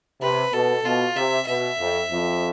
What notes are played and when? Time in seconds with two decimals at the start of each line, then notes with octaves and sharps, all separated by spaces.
0.21 C3 B4
0.53 B2 A4
0.84 B2 F4
1.16 C3 E5
1.47 B2 E5
1.79 F2
2.10 F2